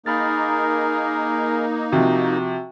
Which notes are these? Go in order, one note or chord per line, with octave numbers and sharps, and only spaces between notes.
A#3 D#4 G#4 A#4 B5 F6 A6
C3 F3 F#4